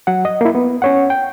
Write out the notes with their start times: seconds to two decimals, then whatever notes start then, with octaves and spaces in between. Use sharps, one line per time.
0.07 F#3 F#5
0.25 D#5
0.41 A#3 E4
0.55 B3
0.82 C#4 C#5 F#5
1.10 G5